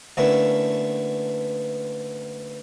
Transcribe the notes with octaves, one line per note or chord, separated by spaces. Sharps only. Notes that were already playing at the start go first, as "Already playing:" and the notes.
D2 A#3 B3 C#4 D4 E4